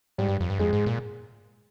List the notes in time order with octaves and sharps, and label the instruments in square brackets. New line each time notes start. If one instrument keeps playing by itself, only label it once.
[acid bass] G#2 [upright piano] G3
[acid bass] G2
F2
G2
[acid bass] F2 [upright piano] G#3
[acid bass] G#2
A#2